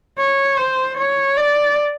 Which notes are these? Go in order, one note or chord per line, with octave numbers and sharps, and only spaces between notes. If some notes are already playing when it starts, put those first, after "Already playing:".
C#5
C5
C#5
D5